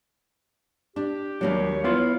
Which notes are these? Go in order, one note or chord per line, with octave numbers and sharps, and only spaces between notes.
D4 G4
D#2 F#3 G3 A#3 D4 C#5
B3 E4 F4 F5